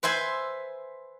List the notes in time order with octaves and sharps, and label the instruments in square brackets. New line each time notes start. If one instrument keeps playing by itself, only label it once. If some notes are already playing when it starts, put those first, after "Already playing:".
[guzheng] B4 C5 E5 G#5 B5